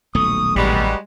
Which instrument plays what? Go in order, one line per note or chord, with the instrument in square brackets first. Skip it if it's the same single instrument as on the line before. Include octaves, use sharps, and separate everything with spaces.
[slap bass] D#1 B1 A3 [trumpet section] C#6 D#6
[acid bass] A1 [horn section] G3 G#3 [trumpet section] D#4 F#4 B4